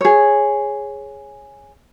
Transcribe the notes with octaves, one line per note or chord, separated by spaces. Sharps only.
G#4 C#5